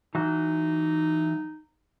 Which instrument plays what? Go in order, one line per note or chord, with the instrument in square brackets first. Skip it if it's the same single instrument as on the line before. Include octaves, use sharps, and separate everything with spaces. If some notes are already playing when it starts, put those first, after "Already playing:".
[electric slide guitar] E3 F#3 F#4 [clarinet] D#4